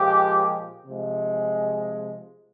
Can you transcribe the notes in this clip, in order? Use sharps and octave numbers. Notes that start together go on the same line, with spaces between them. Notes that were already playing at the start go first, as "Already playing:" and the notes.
Already playing: A#2 F3 G#3 G4
C3 F3 G#3